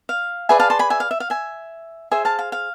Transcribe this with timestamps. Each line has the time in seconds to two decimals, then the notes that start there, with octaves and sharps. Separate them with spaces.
0.09 F5
0.49 G#4 B4 D5 E5 G#5
0.60 F5 A5
0.70 A5 C6
0.79 G#5 B5
0.90 E5 G#5
1.00 F5
1.11 E5
1.20 F5
1.30 E5 G#5
2.11 G#4 C5 E5 G#5
2.25 F5 A5
2.39 F5
2.52 F5